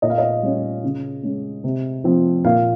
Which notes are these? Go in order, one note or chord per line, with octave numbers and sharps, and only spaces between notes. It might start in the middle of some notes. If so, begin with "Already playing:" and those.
A#2 D#5
F5
D#5
G3 C#4
C#3
G#3 C#4
C3
F3 C4
A#2 F5